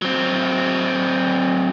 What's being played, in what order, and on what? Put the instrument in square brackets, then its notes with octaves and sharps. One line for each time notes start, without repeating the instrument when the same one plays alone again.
[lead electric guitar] F#3 C4